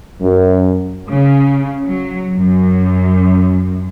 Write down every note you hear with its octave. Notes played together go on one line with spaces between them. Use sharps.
F#2
C#3
F#3
F#2